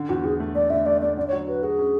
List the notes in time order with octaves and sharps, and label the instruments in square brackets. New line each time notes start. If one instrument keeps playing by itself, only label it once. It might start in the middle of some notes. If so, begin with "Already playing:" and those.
Already playing: [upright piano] D3
[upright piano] E2 [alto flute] F#4
[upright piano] E2 [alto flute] G#4
[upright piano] A3
[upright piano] A3 [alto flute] D5
[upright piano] D3 [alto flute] E5
[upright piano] A3 [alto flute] D5
[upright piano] A3 [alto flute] D5
[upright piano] D3 [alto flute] D5
[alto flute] C#5
[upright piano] F#3
[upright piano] F#4 [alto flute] B4
[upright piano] F#4 [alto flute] G#4
[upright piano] C#4